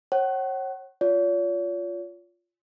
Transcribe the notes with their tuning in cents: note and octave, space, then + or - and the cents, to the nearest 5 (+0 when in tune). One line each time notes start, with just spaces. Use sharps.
C#5 -35 F#5 +40
F4 +0 C#5 +45